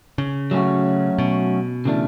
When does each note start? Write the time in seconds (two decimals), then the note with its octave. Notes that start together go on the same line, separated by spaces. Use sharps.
0.18 C#3
0.51 F#3 A3 C#4 F#4
1.19 B2
1.85 C#3 E3 A3 D4